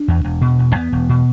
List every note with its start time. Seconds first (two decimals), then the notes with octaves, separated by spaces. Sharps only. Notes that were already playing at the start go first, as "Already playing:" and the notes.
Already playing: D4
0.08 E2
0.24 E1
0.41 B2
0.59 E1
0.75 E2 B3
0.92 E1
1.09 B2